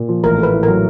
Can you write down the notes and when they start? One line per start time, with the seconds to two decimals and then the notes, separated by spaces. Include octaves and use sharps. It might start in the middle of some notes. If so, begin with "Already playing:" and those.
Already playing: A#2
0.09 F3
0.23 A1 A#4
0.38 A3
0.43 B4
0.54 A2
0.63 F#3 A#4